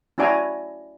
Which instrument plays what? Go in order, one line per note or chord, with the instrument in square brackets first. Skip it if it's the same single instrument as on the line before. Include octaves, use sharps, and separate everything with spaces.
[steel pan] C#4 E4 F#4 D5 G#5 A#5